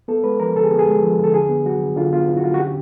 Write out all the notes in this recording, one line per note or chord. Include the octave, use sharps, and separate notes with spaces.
B3 A4
G#3 B4
F3 A#4
D3 A4
G#4
B3 G4
G#4
G#3
F3
D3
A4
D3 G#4
B3
F#3 F#4
D3
D3 F4
B3 F4
F#3 E4
F#4
D3 F4
F#4
C#4 G4